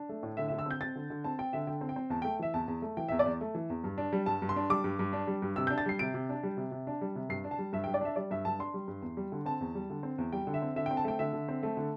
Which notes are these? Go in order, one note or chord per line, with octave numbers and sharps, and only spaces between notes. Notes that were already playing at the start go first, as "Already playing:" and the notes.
Already playing: D4
A3
A2
D3 E5
D3 E5
E6
C4 G6
C4 A6
D3
D3
C4 A5
C4 G5
D3 E5
D3 G5
C4
G5
C4
E2 A5
A3 G5
E3 E5
E2 A5
E2
A3
E3 G5
E2 E5
D5
E2
A3
E3
E2
G2
D4
G3
G2 A5
G2
C6
D4
G3 D6
G2
G2
D4
G3
G2
C3 E6
D4 G6
A6
G3 C7
C3 D7
C3
D4
G3
C3
C3
D4
G3
C3
G2 C7
D4
A5
G3
G2 E5
G2 G5
D5
D4 E5
G3 D5
G2 E5
G2 A5
D4 C6
G3
G2
E2
G3
D3
C4 A5
E2
G3
D3
C4
E2
G3 G5
D3
E5
C4
D3 E5
C4 G5
A5
A3 G5
D3 E5
D3
C4
A3
D3